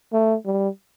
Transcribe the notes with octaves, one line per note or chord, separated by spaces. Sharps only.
A3
G3